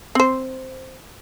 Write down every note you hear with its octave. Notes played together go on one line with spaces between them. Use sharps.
C4 C5